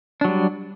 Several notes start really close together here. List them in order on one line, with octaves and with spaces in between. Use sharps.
D4 F#3 G3